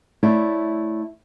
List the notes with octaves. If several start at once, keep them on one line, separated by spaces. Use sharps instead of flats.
A3 E4 C#5 D5